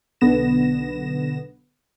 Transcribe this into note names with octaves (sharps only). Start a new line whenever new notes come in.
B1 D3 B3 A#6 E7